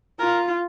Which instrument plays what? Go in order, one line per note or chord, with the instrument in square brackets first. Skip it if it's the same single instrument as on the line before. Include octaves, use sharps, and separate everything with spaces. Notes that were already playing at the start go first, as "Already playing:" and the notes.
[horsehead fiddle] F4 [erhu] A#4